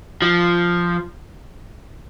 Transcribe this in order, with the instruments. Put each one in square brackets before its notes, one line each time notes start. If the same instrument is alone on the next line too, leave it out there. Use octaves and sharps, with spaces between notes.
[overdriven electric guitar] F3